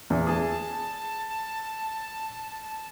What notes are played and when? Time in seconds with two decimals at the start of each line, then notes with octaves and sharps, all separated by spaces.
0.10 E2
0.27 G#4 A5